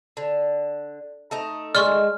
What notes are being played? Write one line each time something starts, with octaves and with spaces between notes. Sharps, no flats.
D3
A3 D#4 A#5
G#3 D5 C6 C#6 F6